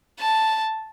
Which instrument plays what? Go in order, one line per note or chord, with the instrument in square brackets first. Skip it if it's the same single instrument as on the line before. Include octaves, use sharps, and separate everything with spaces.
[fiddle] A5